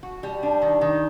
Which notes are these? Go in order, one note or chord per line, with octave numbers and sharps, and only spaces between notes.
F#4
G3
D4
D#3
D#3